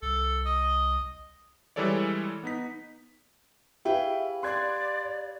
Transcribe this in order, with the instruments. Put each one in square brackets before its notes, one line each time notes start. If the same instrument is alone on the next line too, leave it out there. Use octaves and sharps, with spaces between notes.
[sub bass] C2 [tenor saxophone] A4
[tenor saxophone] D#5
[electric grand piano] E3 G3 G#3 A4 C#5 D5
B3 D#4 B6
[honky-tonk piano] E4 [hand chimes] G4 F5 [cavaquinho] G#4 B4 G5
[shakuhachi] D5 [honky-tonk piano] C6 F#6 G#6